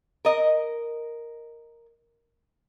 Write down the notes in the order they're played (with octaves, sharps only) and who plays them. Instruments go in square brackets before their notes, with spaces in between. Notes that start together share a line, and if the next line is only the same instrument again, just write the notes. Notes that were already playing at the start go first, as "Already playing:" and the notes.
[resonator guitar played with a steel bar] A#4 D#5